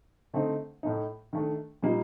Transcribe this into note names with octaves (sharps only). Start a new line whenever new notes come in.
D3 A3 C4 D#4
A2 A3 D#4
D#3 A3 D4
A#2 G3 A#3 D#4